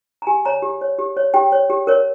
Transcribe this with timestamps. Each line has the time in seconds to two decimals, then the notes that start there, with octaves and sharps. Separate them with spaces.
0.22 A#5
0.27 G4 G#5
0.45 C#5 A#5
0.62 G4
0.81 C#5
0.99 G4
1.17 C#5
1.34 G4 G5
1.52 C#5
1.70 G4
1.87 A#4 C#5